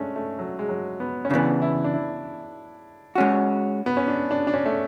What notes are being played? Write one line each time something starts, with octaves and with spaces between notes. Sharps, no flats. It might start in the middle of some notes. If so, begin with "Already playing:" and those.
Already playing: G#3 A3 C#4 D4
A3
F#3
G#3
F#3
B3
C#4
C#3 E3 B3 D4
E4
D4
E4
G#3 C#4 F#4
B3
C#4
D4
D4
D4
C#4
A3